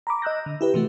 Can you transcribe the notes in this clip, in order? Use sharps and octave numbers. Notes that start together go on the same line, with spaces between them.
A#5 B5 D6
D#5 E6 F#6 G6 A#6
D3
E4 G4 B4
C3 E3 A3 F#4